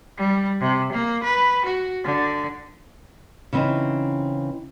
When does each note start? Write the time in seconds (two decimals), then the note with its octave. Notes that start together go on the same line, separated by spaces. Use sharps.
0.17 G3
0.61 C3
0.93 A#3
1.24 B4
1.65 F#4
2.04 D3
3.53 C#3 E3 C4 C#4 D#4